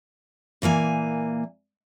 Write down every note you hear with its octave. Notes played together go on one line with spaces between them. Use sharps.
A#2 E3 A#3 G#5